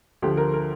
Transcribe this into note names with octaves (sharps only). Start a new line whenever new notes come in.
D2 D3 F3 G4
A#4
A#4